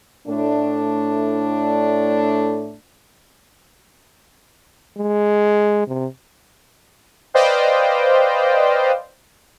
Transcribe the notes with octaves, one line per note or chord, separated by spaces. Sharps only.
A2 A3 D4
G#3
C3
B4 C5 D5 D#5 F5 G5